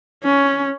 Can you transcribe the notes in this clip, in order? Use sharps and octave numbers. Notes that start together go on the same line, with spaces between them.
C#4